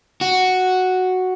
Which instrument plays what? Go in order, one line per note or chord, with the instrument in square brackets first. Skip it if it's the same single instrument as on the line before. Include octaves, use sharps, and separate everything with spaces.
[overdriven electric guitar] F#4